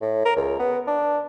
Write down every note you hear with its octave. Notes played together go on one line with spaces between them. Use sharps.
A2
A#4
C#2
B3
D4